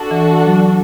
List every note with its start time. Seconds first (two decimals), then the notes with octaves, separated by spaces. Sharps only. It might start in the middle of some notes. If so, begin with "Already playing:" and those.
Already playing: D4 F#4 A4
0.11 E3
0.45 F#3